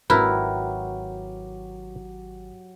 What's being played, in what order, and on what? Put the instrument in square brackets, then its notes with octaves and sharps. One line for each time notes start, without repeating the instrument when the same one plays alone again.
[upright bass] G#1 [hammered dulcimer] F#3 G4 [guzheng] E4 [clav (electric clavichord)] A#4 B4